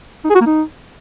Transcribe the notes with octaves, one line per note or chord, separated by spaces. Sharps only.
D#4
G#4
F#4
A#3
D#4